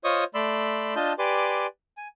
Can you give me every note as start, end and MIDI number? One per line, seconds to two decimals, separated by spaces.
0.04 0.24 65
0.04 0.24 72
0.04 0.24 73
0.04 0.24 75
0.04 0.24 85
0.04 0.24 87
0.34 0.94 57
0.34 0.94 74
0.34 0.94 83
0.34 0.94 84
0.34 0.94 88
0.96 1.13 62
0.96 1.13 65
0.96 1.13 75
0.96 1.13 81
0.96 1.13 91
1.19 1.67 67
1.19 1.67 71
1.19 1.67 74
1.19 1.67 80
1.19 1.67 84
1.19 1.67 86
1.97 2.08 80